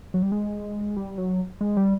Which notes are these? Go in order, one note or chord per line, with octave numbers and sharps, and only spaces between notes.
F#3
G3
G#3
G3
F#3
G#3
G3